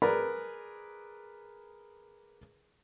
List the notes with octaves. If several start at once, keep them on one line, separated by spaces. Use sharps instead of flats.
G#4 A#4 B4 D5 A#5 B5